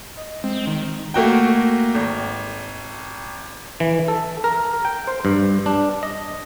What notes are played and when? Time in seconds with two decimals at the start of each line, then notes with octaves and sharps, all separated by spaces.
0.17 D#5
0.44 G#3 C4
0.67 D#3
1.14 A3 A#3 F#4 G5
1.95 G#1
3.80 E3
4.08 A4
4.44 A#4
4.85 G5
5.08 C5
5.25 G2
5.66 D4
6.03 D#5